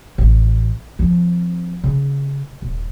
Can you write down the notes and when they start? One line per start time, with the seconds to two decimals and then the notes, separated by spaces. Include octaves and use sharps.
0.18 A1
0.99 F3 C4
1.84 C#3
2.62 D#1